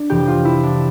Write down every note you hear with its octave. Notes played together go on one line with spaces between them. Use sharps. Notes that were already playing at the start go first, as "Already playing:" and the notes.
Already playing: D4
F2 C3 E3 G4
F4
E4
D4